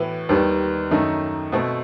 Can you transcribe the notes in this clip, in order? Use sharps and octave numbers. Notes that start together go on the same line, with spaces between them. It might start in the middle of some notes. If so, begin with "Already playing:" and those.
Already playing: A2 E3 B3 F#4
D#2 D#3 G3 B3
F#2 D#3 A3 D#4
B2 A3 C4